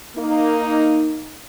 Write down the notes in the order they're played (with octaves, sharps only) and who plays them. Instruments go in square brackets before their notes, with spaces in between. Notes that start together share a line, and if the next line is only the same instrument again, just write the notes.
[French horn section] A#3 D#4